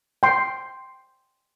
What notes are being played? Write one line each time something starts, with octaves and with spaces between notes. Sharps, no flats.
G5 C6